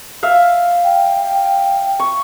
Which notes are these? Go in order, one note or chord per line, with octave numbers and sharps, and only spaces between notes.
E5 F5
G5
C#6